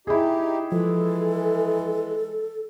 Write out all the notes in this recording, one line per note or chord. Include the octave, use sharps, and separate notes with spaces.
D#4 E4 G4 G#4
E3 F3 G#3 A4